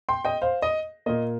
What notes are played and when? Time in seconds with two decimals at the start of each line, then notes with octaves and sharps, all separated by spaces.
0.09 G5 C6
0.25 D#5 G5
0.42 C5 F5
0.62 D#5
1.06 A#2 A#3 D#5